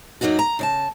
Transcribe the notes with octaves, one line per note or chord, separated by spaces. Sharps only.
F#2 F#3 A#3 D#4 F#4
A#5
C#3 D5 A5